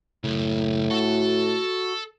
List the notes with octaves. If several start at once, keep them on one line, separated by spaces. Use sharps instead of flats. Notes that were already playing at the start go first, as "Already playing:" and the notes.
F#2 A2 C#3
F#4 A4